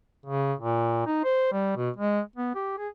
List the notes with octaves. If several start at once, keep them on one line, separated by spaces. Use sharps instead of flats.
C#3
A#2
D#4
C5
G3
B2
G#3
B3
G4
G#4